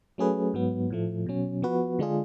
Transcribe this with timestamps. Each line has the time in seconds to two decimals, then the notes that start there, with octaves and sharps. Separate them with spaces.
0.18 F#3 A3 C#4 G#4 B4
0.54 G#2 F#3 B3
0.90 A2 F3 A3
1.26 B2 F#3 C#4
1.62 F3 B3 F#4 B4
1.99 D3 G#3 D4 F4 G#4